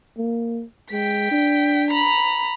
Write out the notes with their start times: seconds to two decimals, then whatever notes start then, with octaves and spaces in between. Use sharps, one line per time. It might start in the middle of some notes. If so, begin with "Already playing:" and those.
0.18 A#3
0.92 G#3 G5 B6
1.31 D4
1.91 A#5 B5